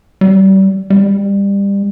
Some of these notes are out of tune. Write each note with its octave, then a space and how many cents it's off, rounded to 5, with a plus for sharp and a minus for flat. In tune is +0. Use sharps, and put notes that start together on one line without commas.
G3 -30
G3 +25